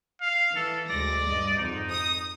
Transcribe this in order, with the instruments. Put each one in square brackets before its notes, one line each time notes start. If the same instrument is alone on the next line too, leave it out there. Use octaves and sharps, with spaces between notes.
[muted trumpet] F5
[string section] E3 [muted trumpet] A4
[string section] D2 G#3 A#6 [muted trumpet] D5
[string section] G2 D#5
[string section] F2 G#2 [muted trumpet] D#4
[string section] D#6